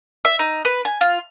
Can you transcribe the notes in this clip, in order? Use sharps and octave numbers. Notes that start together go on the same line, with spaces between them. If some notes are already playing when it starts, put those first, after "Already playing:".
E5
D#4
B4
G#5
F4